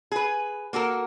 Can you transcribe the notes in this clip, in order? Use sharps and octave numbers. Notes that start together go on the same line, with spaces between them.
G#4 B4
A#3 F#4 A4 A#4